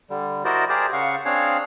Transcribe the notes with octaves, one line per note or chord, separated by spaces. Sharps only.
D3 G3
E4 F#4 A#4 C5 D5 D#5
G4 G#4 A#4 C5 D5
C#3 F5 F#5 C#6
C4 D4 G#4 C#5 F5